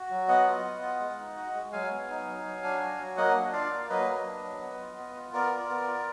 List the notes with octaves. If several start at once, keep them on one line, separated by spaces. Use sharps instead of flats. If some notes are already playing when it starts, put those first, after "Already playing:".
Already playing: F#4
F#3
B3 D#5 F#5
F4
B3
F4
G#3
D#4
F#4
G#3
F#3 F5 G#5
B3
D#4
F#3
F#3
D4
F#4
F#3
A#3 D#5 F#5
D4
F4 D5 F5
A#3
F#3 B4 D#5
A#3
D4
F#3
B3
F4
B3
F4
B3 A#4 D5
F4
B3
F4